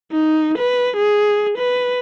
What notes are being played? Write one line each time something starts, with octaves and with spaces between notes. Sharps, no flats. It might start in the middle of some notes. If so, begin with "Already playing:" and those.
D#4
B4
G#4
B4